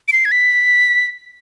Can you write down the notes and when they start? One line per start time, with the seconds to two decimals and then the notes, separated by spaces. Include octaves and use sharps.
0.08 D7
0.13 C7
0.25 G#6
0.32 B6